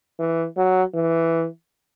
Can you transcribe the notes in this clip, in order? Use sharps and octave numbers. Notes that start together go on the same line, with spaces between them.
E3
F#3
E3